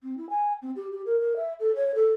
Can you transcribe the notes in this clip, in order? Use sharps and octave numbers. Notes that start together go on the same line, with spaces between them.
C4
E4
G#5
C4
G4
G4
A#4
A#4
E5
A4
C#5
A4